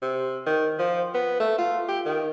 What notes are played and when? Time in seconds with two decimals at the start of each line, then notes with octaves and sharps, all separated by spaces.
0.02 C3
0.46 D#3
0.79 F3
1.14 B3
1.40 A3
1.58 F4
1.89 G4
2.06 D#3